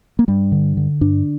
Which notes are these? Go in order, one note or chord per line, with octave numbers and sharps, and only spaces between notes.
A#3
G2 G3
D3
D3
G2 D4